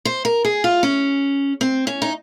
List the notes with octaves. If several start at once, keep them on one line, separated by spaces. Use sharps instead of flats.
C5
A#4
G#4
F4
C#4
C4
C#4
D#4